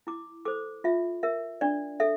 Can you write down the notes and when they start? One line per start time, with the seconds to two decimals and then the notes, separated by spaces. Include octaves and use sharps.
0.07 E4 D6
0.45 A4 C5 D6
0.84 F4 E5
1.23 A#4 E5
1.61 D4 D5
2.00 A4 E5